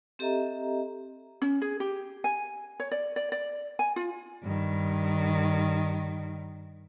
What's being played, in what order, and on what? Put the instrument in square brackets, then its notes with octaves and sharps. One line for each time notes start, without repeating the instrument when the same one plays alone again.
[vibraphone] C4 G4 A4 D#5 E5 A#5
[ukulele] C#4
G#4
G4
G#5
C#5
D5
D5
D5
G#5
F4
[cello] G2 D#3